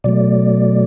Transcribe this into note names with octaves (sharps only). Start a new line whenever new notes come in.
B2 F#3 A3 D5